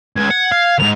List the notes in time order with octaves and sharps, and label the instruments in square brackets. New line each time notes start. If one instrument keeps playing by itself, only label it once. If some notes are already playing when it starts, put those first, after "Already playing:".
[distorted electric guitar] C#2 [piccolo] G#6
[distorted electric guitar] F#5
F5
[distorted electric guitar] D#2 G#2 [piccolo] F7